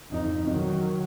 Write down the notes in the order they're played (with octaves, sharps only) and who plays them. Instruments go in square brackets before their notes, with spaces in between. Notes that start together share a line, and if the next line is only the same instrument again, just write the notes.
[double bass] F2 D#4
D#3 F#3